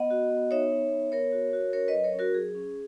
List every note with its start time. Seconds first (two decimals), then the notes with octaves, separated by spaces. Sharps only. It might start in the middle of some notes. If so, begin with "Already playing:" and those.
Already playing: B3 D#5 F#5
0.10 F#4
0.31 B3
0.51 D#4 C#5 E5
0.72 D#4
0.92 B3
1.12 B3 A#4 C#5
1.32 F#4
1.53 F#4
1.73 C#4 A#4 C#5
1.88 B4 D#5
1.94 F#3
2.04 A#4 C#5
2.14 C#4
2.19 F#4 A#4
2.34 F#3 G#4
2.55 C#4